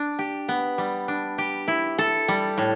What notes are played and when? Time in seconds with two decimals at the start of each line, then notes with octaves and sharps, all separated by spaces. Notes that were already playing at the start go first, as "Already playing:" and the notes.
Already playing: D4
0.19 G4
0.49 B3
0.78 G3
1.08 D4
1.38 G4
1.68 E4
1.98 A4
2.28 G3
2.58 A2